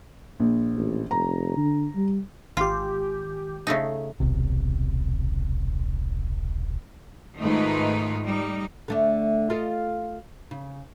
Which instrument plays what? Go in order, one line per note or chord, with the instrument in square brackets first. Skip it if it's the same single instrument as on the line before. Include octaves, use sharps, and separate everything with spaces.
[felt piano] A#1
[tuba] A1
[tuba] F1 [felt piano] A#5
[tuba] D3
G3
[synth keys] G#1 G4 [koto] F4
[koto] C#3 A3 D#4
[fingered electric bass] D#1 B1 C3
[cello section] G#2 D#3 A3 D#4 F4 B4
G3 D#4
[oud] D3 A3 D4
F4 A4 D#5
C#3